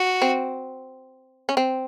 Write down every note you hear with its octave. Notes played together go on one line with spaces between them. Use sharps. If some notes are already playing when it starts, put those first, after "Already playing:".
Already playing: F#4
C4
C#4
C4